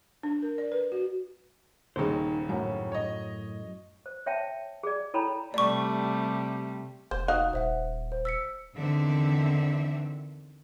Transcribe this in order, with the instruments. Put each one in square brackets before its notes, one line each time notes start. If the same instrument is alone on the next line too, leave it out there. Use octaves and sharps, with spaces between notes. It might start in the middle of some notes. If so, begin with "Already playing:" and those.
[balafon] D4
A#4
D5
B4
F#4
[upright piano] D#1 D#2 C#3 [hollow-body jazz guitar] D#4 C5
[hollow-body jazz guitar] F#2 A2
[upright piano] C#5 D#5
[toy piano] C5
C#5 E5 G5 A5
G#4 D5
E4 A4 C#5 G5 A#5 B5
[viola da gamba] C3 G3 A3 [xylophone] D5 C#6
[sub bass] F1 [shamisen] C5
[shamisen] D#4 F#4 F5 [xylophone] D#6 F#6
[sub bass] D#1 [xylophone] C5 E5 F#5
[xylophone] C5
E6 B6 C#7
[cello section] E2 D3 D#3 C4 E5